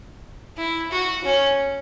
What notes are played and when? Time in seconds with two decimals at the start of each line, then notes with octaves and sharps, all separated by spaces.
0.57 E4
0.91 F#4
1.24 C#4